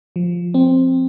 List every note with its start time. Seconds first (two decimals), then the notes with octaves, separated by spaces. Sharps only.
0.16 F3
0.54 C4